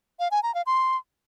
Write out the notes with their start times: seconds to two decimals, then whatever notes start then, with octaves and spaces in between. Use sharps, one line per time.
0.20 F5
0.31 G#5
0.43 A#5
0.55 F5
0.66 C6